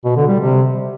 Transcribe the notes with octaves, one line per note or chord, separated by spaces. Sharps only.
B2
D3
G3
C3